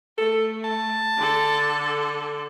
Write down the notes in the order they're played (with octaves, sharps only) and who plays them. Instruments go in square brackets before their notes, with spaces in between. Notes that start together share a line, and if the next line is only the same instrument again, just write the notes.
[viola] A3 [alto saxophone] A4
[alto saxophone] A5
[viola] D3 A4